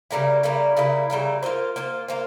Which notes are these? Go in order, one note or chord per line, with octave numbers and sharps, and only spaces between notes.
C#3 G3 A#3 E4
C#3 G3 A#3 E4
C#3 G3 A#3 E4
C#3 G3 A#3 E4
A#3 F4 C5
A#3 F4 C5
A#3 F4 C5